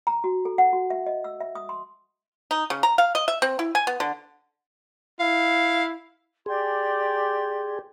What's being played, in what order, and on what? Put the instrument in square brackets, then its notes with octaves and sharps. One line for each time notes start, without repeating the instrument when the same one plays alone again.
[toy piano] A#5
F#4
A4
F#5
F#4
E5
D#5
E6
E5
D#6
C6
[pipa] D#4
C#3
A#5
F5
D#5
E5
C4
E4
G#5
B3
D3
[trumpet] E4 [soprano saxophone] F5
[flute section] G4 D5 C6 [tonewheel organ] G#4